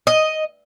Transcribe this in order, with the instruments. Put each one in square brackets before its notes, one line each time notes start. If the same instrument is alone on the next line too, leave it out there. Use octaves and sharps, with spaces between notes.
[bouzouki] D#5